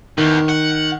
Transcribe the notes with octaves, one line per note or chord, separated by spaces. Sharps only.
E2 D#3
F#5